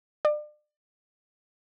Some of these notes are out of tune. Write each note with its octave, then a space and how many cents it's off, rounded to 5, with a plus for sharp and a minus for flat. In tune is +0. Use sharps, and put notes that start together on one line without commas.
D5 +35